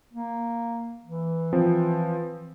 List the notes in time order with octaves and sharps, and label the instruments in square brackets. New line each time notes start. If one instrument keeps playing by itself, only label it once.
[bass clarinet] A#3
E3
[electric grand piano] F3 C4